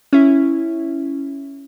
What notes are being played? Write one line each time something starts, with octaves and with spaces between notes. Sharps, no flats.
C#4 E4